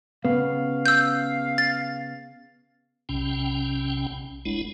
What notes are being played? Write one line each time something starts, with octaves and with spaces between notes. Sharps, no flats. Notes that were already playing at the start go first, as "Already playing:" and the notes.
C#3 B3 F5
E6 G6
A6
B1 C3 C#4 G5
F#1 G#3 D4 E4